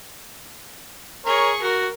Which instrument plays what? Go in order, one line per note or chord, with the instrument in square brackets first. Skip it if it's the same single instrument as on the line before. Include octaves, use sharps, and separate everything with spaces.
[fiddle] G#4 C#6 [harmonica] A#4 C#5
[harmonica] F#4 [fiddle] A#4